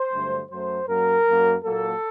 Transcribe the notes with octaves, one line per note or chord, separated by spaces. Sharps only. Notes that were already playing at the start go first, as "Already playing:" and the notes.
Already playing: C5
G2 D3 F#3 A3
F#2 F#3 A3 C5
F#2 F#3 A#3 A#4
F#2 F#3 A#3
A#2 F#3 A#3 A4